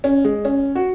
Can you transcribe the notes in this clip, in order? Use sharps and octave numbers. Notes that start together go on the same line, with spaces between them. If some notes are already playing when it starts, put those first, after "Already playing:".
C#4
G#3
C#4
F#4